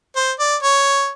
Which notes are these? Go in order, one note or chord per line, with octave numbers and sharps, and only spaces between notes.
C5
D5
C#5